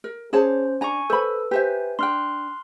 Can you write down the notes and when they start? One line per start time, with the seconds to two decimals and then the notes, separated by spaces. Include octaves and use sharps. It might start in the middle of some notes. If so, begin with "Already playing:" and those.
0.04 A#4
0.33 C#4 G#4 C5 C#5 A5
0.81 D4 G#5 A#5 C#6
1.10 A4 B4 C5 B5
1.51 G4 B4 C5 E5 G#5
1.99 D4 G5 C6 F6 F#6